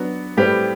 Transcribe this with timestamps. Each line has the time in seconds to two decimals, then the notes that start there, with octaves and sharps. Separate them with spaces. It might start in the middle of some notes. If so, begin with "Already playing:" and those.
Already playing: F#3 B3 D4 F#4
0.37 A2 G3 C4 G4 B4